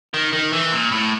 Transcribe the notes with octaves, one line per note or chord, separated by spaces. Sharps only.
D#3
D#3
E3
A#2
A2